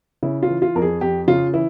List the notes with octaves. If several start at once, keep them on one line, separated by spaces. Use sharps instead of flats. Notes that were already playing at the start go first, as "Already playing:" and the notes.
C#3 E4
F4
E3
F4
F2 A#4
G#4
F2 G4
C#3 F4
E3 E4